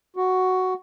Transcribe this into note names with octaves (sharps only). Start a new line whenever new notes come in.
F#4